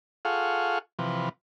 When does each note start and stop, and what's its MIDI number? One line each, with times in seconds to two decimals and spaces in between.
0.25 0.79 65
0.25 0.79 68
0.25 0.79 69
0.25 0.79 77
0.25 0.79 78
0.25 0.79 85
0.99 1.29 48
0.99 1.29 52
0.99 1.29 53
0.99 1.29 71